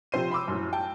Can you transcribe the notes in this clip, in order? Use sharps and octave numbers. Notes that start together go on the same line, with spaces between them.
C3 F3 C4 C5 C7 D#7
B5 C6 D6 E6
F#2 A2
G5 A5